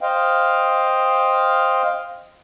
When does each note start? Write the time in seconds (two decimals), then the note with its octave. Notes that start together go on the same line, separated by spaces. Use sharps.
0.01 C5 D#5 F5 G5